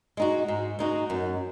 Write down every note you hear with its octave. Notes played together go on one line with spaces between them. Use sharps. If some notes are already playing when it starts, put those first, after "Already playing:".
G#3 D#4 F#4
G#2
G#3 D#4 F#4
F#2